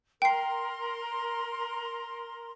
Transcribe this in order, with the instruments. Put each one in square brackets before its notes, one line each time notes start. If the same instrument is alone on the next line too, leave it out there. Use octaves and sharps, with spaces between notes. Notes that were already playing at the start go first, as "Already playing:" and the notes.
[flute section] A#4 C6 [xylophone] G5 C7